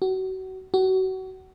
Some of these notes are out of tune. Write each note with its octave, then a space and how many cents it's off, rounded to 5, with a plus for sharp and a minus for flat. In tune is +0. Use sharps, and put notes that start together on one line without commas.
F#4 +30
F#4 +30